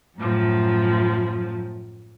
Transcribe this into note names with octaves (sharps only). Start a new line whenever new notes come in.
F#2 A2 F3